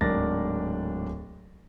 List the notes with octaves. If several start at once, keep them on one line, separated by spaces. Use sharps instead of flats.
D1 G#2 D4 A#4 A6 A#6